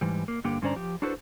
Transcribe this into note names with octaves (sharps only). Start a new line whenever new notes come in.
G#2 E3 G3
A#3
G2 D3 A#3 G4 G5
G2 D3 C#4 C5 D5 A#5
F3 G4
D4 E4 F#4 A4 B4 C5